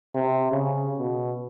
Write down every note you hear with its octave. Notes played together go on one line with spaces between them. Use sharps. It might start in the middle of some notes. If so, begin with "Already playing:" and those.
C3
C#3
B2